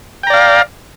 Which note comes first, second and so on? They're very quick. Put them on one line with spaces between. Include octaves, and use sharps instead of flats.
G5 A#5 D5 F5